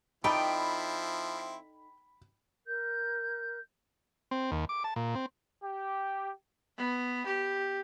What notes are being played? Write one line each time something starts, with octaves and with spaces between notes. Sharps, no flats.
F3 C4 D#4 E4 A4 D5 G5 B5
A#4 G6
C4
D#2
D6
A5
A#2
C4
G4
B3
G4